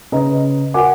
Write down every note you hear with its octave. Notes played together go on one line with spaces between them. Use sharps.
C#3 B4 D#5 A#5
F#4 A#4 F#5 G#5 D6